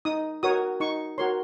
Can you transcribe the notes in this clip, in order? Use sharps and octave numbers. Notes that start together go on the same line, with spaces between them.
D#4 D#6
F#4 A#4 C#5 D#6
D#4 C#6
F#4 A#4 C#5 C6